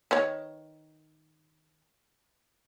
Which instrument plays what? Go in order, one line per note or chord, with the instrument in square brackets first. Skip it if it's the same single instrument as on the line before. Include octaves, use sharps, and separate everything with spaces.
[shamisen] D#3 B4 C#5